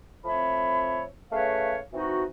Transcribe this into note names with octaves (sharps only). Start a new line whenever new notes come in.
A2 F3 C4 C#5 E5 B5
C#3 A3 B4 C#5 F5
E3 C4 D#4 F#4